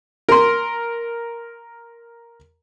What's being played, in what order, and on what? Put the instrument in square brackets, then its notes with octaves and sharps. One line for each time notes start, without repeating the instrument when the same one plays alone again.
[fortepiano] A#4 C6